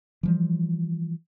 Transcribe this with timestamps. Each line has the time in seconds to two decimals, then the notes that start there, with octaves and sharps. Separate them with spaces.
0.23 E3 F3 G3